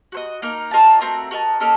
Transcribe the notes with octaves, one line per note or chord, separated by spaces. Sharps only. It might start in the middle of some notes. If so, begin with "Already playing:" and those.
F#4 C5 D#5
A#3 D#4 A#4
F4 A#4 D#5 A5
A3 C4 F#4 A#4
F#4 A#4 D#5 A5
A#3 C#4 A4 D#5